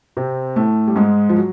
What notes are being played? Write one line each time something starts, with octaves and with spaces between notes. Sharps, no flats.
C3 C4
A2 A3
G3
G#2 G#3
F3
F#3